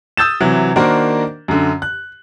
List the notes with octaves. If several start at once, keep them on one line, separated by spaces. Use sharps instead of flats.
D#6 E6 G6 A6 E7
C3 E3 F#3
D#3 A#3 D4 F#4 A#4 C5
F#2 D3
F#6